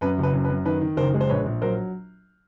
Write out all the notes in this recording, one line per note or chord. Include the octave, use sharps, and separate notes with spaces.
F#2 B4
F#1
B4
F#2
B4
F#2
D#3 B4
D#3
F#1 A#4 C5
G#3
C5
A#1 B4 C#5
A#1
F#3 A#4 C5